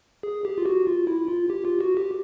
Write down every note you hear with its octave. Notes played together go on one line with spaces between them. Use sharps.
G#4
G4
F4
F#4
F4
E4
F4
G4
F4
F#4
G4